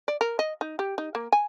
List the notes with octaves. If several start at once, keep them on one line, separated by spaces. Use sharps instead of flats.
D5
A#4
D#5
D#4
G4
D#4
A#3
G#5